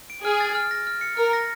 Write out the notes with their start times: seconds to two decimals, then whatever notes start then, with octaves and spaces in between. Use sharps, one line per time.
0.10 D7
0.24 G#4 F6
0.40 A6
0.55 F6
0.71 A#6
0.87 F6
1.01 C#7
1.17 A#4 F6
1.33 A#6